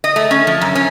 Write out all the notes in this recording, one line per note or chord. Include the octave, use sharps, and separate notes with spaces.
D#5
A3
C#4
F3
F#2
C#4